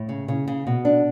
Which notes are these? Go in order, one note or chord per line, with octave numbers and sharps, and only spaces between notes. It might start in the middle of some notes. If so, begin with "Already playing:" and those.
Already playing: A2
C#3
C#3
C#3
B2
D4